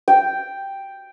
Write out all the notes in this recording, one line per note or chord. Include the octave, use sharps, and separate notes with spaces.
G5